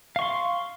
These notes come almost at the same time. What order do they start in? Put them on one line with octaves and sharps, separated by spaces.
F5 C#6 C6